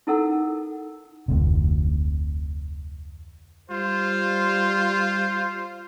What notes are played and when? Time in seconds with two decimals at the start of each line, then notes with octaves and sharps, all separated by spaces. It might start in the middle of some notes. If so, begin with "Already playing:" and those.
0.07 D#4 E4 A4 A#4 F#5 E6
1.28 F1 D2 C3
3.70 G3 F4 C5